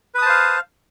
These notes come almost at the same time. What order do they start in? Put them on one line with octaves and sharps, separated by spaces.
B4 D#6 A5 C5 F5